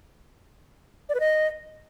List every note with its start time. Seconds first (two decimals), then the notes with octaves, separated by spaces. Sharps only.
1.09 D5
1.15 B4
1.20 D#5